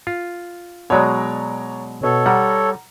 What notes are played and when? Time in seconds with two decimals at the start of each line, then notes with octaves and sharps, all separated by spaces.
0.07 F4
0.90 B2 F#3 G#3 C#5 D5 A#5
2.03 B2 A4 C#5
2.26 G3 F#5 A#5